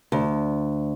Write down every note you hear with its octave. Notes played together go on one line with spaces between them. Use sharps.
D2